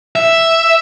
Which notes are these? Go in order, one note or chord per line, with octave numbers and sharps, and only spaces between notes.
E5